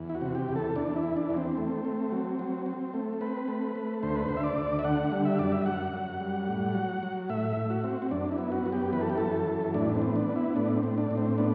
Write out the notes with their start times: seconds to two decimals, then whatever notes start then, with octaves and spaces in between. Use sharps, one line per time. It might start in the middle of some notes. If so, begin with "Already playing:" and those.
Already playing: E2
0.09 E4
0.15 F#4
0.21 C3
0.35 G4
0.48 E2
0.56 A4
0.76 E2 D4
0.96 E4
1.03 E3
1.17 D4
1.30 E2
1.37 C4
1.57 A3
1.85 A3
2.12 F#3
2.39 F#3
2.66 C4
2.94 A3
3.21 C4 B4
3.48 A3
3.75 A3
4.03 D2 C5
4.15 B4
4.29 D2 C5
4.37 E5
4.44 D5
4.57 D2
4.79 E5
4.84 D3 F#5
5.12 G3
5.25 E5
5.39 F#2 D5
5.52 E5
5.66 F#2 F#5
5.93 F#2
6.21 G3
6.48 A2
6.75 F#3
7.03 F#3
7.29 A2 E5
7.57 A2
7.70 F#4
7.84 C4
8.02 C4
8.11 F#2 D4
8.32 E4
8.38 B3
8.52 F#4
8.66 F#2
8.72 G4
8.93 E3 B4
9.01 A4
9.10 G4
9.18 F#2 A4
9.47 E3
9.74 A2 D4
9.95 C4
10.02 B3
10.16 D4
10.29 B3
10.36 E4
10.56 A2 D4
10.76 C4
10.83 A2
10.98 D4
11.11 A2
11.17 C4
11.38 B3 D4